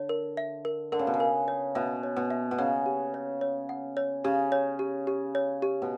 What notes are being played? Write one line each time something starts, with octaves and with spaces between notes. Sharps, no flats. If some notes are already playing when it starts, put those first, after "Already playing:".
Already playing: D3 C#5
A#4
E5
A#4
D3 A#4
C#3
B2
C#3
A#4
C#5
B2 E5
C#5
B2
E5
B2
C#3 F#5
G4
C#5
C#5
F#5
C#5
C#3 G4
C#5
G4
G4
C#5
G4
B2